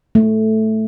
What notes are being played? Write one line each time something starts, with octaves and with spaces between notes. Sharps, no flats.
A3